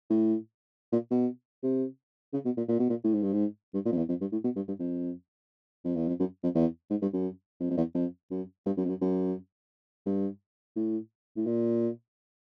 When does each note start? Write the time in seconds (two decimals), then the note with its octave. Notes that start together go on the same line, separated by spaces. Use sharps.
0.10 A2
0.92 A#2
1.11 B2
1.63 C3
2.34 C#3
2.45 B2
2.58 A#2
2.69 A#2
2.79 B2
2.90 A#2
3.04 A2
3.14 G#2
3.23 G2
3.33 G#2
3.74 G2
3.86 A#2
3.92 F2
3.98 E2
4.09 F2
4.21 G2
4.32 A2
4.44 B2
4.56 G2
4.68 G2
4.80 F2
5.85 F2
5.96 E2
6.08 F2
6.20 F#2
6.43 F2
6.55 E2
6.90 G#2
7.02 G2
7.13 F#2
7.60 F2
7.70 F2
7.77 E2
7.95 F2
8.31 F#2
8.66 G2
8.77 F#2
8.85 F2
8.89 F#2
9.01 F#2
10.06 G2
10.76 A2
11.36 A2
11.47 A#2